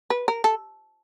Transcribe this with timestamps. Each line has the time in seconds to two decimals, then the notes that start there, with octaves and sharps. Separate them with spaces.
0.10 B4
0.28 A#4
0.44 A4